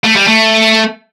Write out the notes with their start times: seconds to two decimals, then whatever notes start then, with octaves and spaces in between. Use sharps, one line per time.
0.05 A3
0.16 G3
0.28 A3